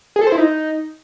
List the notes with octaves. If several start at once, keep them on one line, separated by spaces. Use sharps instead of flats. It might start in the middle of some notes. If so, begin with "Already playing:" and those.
G#4
A4
C5
E4
D#4